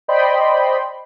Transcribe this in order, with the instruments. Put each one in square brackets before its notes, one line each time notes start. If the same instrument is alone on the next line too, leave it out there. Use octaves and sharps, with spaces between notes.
[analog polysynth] C5 D5 D#5 G5 B5 C6